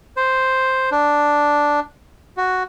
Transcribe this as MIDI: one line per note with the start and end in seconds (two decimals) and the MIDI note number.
0.17 0.90 72
0.92 1.80 62
2.37 2.63 66